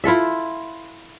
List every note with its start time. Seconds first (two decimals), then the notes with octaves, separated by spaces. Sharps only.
0.04 E4 F4 A4 E5